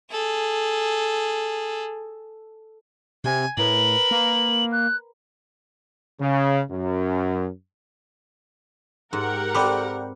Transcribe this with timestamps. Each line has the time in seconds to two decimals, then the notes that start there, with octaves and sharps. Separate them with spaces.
0.11 G#4 A4
3.24 C3 G#5
3.57 A2 A#4 B4 F#7
4.11 A#3
4.72 F#6
6.20 C#3
6.71 F#2
9.13 G#2 G4 A#4 F#5
9.54 C4 A4 B4 D5 G5 B5 D6